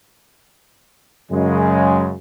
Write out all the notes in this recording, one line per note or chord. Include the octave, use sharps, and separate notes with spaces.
F#2 C#3 G#3